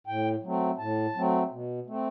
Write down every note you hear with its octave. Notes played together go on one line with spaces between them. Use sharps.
A2 G5
F#3 A3 C4
A2 A5
F#3 A3 C4
B2
A3 C4